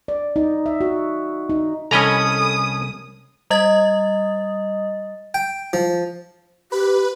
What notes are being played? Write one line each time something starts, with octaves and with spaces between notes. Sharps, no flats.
D5
D#4
E5
F#4
D#4
C2 C#4 A4 D#5 G#5 A#5 B5 D#6
G3 D#5 D#6 A6
G5
F3
G4 B4